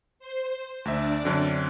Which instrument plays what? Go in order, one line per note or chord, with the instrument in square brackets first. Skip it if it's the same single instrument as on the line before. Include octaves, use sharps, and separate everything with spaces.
[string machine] C5
[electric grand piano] D2 E5 [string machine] D4 D5
[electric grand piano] F#2 D3 C4